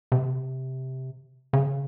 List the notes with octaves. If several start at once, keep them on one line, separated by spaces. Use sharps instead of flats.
C3
C#3